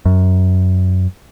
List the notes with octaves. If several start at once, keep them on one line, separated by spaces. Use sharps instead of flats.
F#2